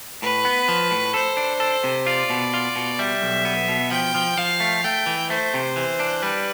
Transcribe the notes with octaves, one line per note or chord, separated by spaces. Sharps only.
A2 B4
B3
F3
A2
A4 C5
D4
A4
C3
F4 D5
B2
F4
B2
G3 E5
B1
B3
B2
F3 G5
F3
F3 F5
A3
A3 G5
E3
A3 C5
C3
E3
D4
G3 B4